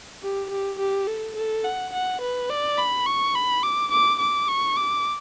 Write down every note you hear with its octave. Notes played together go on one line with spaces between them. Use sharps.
G4
G4
G4
A4
A4
F#5
F#5
B4
D5
B5
C#6
B5
D6
D6
D6
C#6
D6